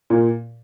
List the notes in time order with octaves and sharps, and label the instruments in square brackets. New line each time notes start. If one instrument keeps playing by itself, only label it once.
[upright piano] A#2